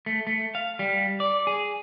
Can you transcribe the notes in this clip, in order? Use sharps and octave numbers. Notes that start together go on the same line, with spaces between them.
A3
A3
F5
G3
D5
G#4